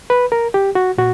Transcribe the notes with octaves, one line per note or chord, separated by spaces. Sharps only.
B4
A#4
G4
F#4
A#2 F#4